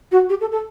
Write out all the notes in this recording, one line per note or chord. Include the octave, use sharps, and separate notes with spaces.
F#4
G4
A4
A4